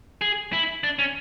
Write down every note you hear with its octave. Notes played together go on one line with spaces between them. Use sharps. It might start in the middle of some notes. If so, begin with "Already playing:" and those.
G#4
E4
D4
C#4